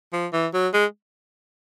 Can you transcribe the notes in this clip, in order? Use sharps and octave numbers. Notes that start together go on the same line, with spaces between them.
F3
E3
F#3
G#3